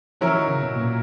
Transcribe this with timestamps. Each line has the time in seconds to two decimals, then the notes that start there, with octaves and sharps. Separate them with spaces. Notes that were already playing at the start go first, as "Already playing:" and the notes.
0.21 E3 F#3 C#4 E4 A#4
0.35 D#3
0.48 C#3
0.62 B2
0.75 A#2